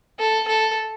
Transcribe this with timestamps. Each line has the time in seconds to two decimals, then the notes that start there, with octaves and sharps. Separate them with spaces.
0.19 A4
0.48 A4